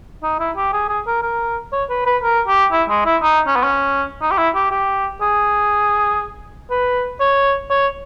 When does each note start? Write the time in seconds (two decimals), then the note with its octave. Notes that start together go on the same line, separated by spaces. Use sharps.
0.23 D#4
0.40 E4
0.56 G4
0.73 G#4
0.89 G#4
1.07 A#4
1.22 A#4
1.73 C#5
1.90 B4
2.06 B4
2.23 A#4
2.48 G4
2.72 E4
2.89 G#3
3.05 E4
3.23 D#4
3.47 C#4
3.56 B3
3.64 C#4
4.22 D#4
4.31 G4
4.38 E4
4.55 G4
4.71 G4
5.21 G#4
6.70 B4
7.20 C#5
7.70 C#5